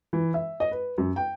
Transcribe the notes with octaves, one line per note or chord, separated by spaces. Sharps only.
E3
E5
D#5
B4
F#2
G5